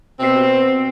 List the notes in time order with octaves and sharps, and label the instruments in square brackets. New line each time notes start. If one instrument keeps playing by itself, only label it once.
[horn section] B2 C4